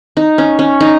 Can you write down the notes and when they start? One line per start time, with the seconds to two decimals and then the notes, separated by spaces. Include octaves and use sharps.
0.17 D#4
0.38 C#4
0.59 C#4
0.81 D#4